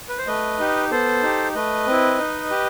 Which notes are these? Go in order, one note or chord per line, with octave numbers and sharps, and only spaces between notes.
B4
C5
A3 B4 D#5
D#4 G4
B3 A4 C5
D#4 G4
A3 B4 D#5
C4 E4
D#4
G4